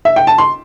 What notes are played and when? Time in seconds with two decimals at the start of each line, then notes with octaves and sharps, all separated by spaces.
0.05 E5
0.16 G5
0.27 A5
0.38 C6